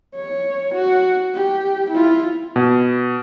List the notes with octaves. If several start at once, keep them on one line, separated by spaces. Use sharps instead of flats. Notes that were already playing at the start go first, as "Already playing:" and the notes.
C#5
F#4
G4
E4 F4
B2